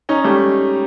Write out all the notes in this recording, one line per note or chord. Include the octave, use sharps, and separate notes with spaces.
C#4 D#4
G3 A3